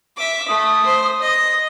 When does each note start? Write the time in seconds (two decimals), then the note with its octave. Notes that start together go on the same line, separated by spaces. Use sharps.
0.17 E5 D6
0.48 A3 D#6
0.85 C5
1.21 D#5